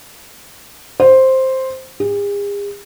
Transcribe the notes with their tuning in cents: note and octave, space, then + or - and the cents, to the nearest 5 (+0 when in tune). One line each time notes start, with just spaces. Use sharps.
C5 +5
G#4 -45